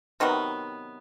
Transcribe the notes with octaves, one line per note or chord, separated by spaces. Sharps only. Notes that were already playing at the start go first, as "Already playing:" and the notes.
C3 D#3 F#3 B3